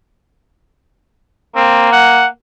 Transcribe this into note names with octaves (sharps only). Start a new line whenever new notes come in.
A#3 C4
F#5